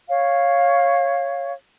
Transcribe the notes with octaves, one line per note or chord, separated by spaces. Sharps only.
C#5 F5